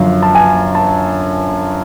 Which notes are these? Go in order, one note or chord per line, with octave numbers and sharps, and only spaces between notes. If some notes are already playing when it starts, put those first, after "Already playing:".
Already playing: F#2 D3 F3 F5
A5
G#5
A5